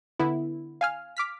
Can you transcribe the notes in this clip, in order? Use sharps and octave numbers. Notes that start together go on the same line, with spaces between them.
D3 B3 E4
F5 G#5 F6
D6 F6 B6